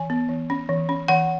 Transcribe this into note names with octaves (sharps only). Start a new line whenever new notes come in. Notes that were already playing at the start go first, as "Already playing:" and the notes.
Already playing: E3 G#5
B3
E3
C#4
E3
C#4
E3 F#5